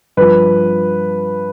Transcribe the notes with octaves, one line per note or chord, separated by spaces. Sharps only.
G2 F3 B4